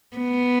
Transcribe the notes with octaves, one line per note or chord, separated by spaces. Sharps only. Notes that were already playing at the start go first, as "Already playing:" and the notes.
B3